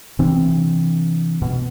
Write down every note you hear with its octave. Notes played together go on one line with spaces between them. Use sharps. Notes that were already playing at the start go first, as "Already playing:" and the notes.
C3 E3 C4 D4
B2